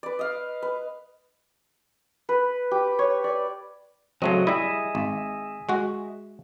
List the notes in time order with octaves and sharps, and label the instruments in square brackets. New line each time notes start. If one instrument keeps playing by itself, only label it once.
[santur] B4 D5
D#5 F5
B4
B4
G4
C#5
D5
[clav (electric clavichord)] C#3 A3 C4 [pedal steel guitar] F#3 D#5
[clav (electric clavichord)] G3 E4 [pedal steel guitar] G#4 D#5 E5
[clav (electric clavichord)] G#1
G#3 F#4